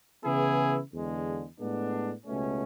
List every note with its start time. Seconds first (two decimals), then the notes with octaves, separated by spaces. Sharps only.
0.25 C#3 E3 B3 E4 G#4
0.92 E2 D3 G#3
1.59 A2 G#3 B3 D4
2.26 C#2 B2 A3 C#4